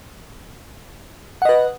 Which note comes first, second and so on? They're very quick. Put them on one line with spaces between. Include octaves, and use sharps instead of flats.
F#5 D#5 B4